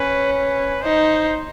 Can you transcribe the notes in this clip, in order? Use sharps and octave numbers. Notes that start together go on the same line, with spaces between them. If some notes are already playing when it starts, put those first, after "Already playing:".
Already playing: C#4 B4
B4
D#4 C5